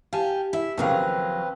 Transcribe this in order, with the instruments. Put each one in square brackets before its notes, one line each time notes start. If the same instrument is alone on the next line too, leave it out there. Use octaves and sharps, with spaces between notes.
[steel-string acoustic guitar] G4 [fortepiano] F5 G#5 A5
[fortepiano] E4 [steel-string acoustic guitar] E5
[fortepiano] D#2 C#3 F5 [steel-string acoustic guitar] F3 F#3 D#5 [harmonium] C4 B4